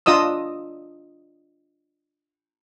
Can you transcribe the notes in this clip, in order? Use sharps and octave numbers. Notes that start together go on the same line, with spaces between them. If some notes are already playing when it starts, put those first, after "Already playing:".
D4 F4 D#5 D#6 E6